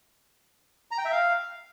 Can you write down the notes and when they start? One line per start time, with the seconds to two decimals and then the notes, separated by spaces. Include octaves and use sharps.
0.91 A#5
0.98 G5
1.05 E5
1.12 F5